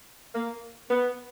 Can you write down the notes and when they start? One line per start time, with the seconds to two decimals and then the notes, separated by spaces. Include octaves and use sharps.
0.34 A#3
0.90 B3